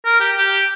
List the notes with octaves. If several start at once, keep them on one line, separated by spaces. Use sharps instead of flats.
A#4
G4
G4